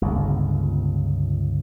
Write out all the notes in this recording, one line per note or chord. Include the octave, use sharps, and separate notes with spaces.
G1 C#2